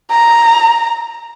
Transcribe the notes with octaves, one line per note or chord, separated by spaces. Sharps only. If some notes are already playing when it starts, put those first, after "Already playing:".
A#5